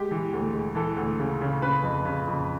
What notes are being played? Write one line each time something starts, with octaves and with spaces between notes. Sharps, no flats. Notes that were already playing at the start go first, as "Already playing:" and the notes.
Already playing: G#3 G4
E3
D2
G#3
E3 A4
D2
C#3
C#3
C#3 B4
F2
C#3
F2